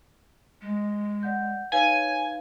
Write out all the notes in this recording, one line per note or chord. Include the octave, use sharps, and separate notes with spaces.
G#3
D5 F#5 G6
D#4 B4 C#5 F5 G#5